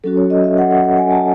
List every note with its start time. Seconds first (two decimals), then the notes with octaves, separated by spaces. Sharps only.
0.04 F#3 C#4 F#4 A4
0.17 C#5
0.30 D#5
0.44 E5
0.58 F#5
0.71 F#5
0.84 F#5
0.98 G#5
1.11 A5